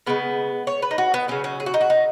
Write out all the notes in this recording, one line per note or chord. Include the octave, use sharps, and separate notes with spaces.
C#3 G#3 B3
C#5
B4
D#4
F#4
B3
C#3 F#3 C#4
C#4
G#4
F#4
D#4
F#4
D#4